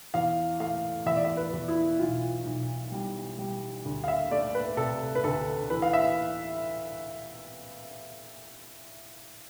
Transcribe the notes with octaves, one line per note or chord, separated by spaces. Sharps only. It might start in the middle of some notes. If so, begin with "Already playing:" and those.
E2 F5
A3 F5
E2 E5
D5
E5
B4
E2
E4
B1 F4
B1
G3
G3
D2
F5
E5
A3 D5
B4
C3 A4
B4
D2 A4
E3 B4
F5
E5